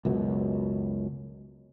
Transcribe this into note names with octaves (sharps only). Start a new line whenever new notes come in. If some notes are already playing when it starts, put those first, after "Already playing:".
C#2 F#2 B2